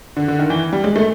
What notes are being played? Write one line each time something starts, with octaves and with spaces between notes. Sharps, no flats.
D3
D3
D#3
E3
G3
G#3
A3